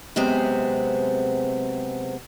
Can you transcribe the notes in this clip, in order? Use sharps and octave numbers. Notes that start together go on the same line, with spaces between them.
F#2 C3 G#3 B3 C4 G#4